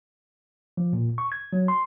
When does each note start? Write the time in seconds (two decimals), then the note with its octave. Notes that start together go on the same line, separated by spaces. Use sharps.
0.77 F3
0.93 A#2
1.18 C#6
1.32 G#6
1.53 F#3
1.68 C6